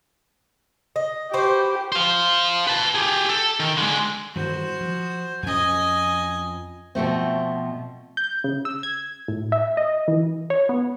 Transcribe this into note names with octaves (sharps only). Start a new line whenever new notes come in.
D#5
F#4 G4 B4 C5
C5 F5
B4 A5
G4 G#4
A4
D#3
D3 G#3
G2 D#3 E3 F#4 C5
F3
F2 C#4 D#5 G#5
B2 F3 A3 C4
G6
C#3
E6
G#6
A2
E5
D#5
E3
C#5
B3